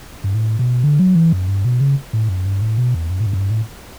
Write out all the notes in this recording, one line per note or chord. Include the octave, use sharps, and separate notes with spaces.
G2
A2
B2
D3
F#3
E3
F#2
G2
B2
C#3
A2
F#2
G2
A2
B2
E2
F#2
A2
G2
F#2
G2
A2